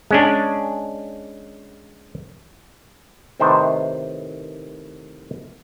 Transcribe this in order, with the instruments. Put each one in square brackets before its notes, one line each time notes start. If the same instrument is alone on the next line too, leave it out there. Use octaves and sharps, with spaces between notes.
[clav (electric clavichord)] G#3 C#4 D4
A2 C3 D#3 B4 C5 D5